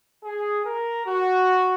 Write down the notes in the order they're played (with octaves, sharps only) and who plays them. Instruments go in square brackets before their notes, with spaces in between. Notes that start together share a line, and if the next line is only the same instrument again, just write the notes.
[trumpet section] G#4
A#4
F#4